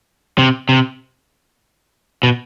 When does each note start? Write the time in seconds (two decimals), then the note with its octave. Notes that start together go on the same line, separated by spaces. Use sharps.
0.38 C3
0.69 C3
2.23 B2